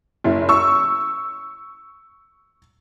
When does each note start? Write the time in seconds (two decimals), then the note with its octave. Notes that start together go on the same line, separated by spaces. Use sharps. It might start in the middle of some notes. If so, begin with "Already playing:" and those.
0.24 F#1 E4
0.49 C#6 E6